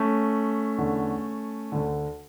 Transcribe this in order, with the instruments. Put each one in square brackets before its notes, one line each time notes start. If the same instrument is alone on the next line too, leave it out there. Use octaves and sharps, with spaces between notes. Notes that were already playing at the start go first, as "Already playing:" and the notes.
Already playing: [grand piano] A3 C#4
E2 D3
D2 D3